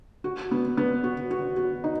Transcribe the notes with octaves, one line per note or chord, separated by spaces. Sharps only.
F#4
B3
B3
F#4
F#4
F#4
D#4